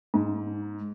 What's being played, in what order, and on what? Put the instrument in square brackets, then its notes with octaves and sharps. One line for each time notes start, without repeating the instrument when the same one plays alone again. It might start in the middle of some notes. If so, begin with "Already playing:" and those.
[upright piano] G#2